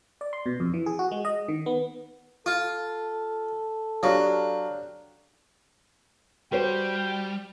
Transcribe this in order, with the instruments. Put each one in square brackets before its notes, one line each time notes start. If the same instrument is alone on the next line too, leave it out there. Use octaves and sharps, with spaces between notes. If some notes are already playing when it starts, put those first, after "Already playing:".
[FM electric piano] D5
C6
B2
F2
E3
G#4
F#4
G#3
D#5
D#3
B3
[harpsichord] F4 [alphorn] A4
[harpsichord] F#3 [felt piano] D4 G4 F5
[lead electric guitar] G3 [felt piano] F#4 C5 [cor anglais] G5